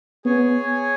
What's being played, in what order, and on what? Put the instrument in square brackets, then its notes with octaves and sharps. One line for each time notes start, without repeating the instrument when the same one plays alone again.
[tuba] B3 [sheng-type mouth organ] G#4 C#5 G#5